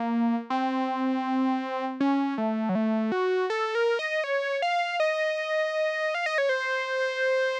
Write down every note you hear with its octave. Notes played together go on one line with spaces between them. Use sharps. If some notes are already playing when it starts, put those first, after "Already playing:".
Already playing: A#3
C4
C#4
A3
F#3
A3
F#4
A4
A#4
D#5
C#5
F5
D#5
F5
D#5
C#5
C5